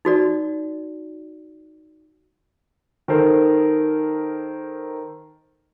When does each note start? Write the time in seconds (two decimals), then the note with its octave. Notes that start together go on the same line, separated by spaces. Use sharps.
0.05 D#4 F#4 D5
3.08 D#3 A4 A#4 C5